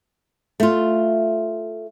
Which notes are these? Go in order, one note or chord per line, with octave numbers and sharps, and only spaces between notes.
A3 F4